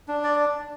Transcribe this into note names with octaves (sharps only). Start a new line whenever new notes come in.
D4
D5